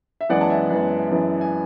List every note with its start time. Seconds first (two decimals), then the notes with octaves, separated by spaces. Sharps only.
0.21 E5
0.30 F#2 E3 G#3 B3 D5 F#5
0.41 A5
0.50 E5 G#5
0.70 F#2 E3 G#3 B3
1.11 F#2 E3 G#3 B3
1.41 G#5